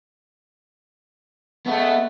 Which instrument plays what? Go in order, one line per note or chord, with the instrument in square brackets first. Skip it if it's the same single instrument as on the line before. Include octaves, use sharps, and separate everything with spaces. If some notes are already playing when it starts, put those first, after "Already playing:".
[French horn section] C#3 G#3 A3 [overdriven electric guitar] B3